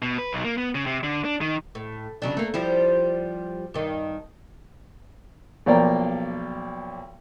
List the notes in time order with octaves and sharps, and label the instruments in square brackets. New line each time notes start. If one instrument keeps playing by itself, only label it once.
[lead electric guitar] B2
B4
B1
A#3
B3
C#3
C3
D3
D4
D#3
[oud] A2
C#3 F#3 D4
A3 A#3
F3 G3 E4
G2 D#3
[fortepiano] B1 F3 A#3 D5 G5 A#5